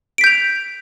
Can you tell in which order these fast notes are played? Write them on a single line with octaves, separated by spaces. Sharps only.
D7 B6 G6 F7